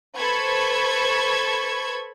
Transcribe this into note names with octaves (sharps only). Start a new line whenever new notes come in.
A4 B4 C5 B5 C#6 G#6